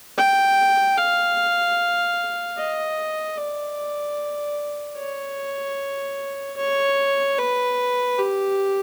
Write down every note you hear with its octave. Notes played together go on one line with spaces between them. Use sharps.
G5
F5
D#5
D5
C#5
C#5
B4
G4